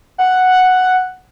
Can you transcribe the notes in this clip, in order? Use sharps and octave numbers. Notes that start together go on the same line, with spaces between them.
F#5